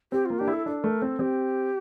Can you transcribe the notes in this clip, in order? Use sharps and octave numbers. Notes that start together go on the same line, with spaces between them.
C4 G4
A#3 F4
D4 G4
E4
A4
D4 A4
A3 A#4
C4 A4
C4 G4